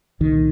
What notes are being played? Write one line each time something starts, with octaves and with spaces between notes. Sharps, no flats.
C2 A#2 D#3